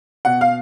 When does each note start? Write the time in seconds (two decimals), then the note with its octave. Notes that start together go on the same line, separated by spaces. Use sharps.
0.25 B2 F#5
0.41 F5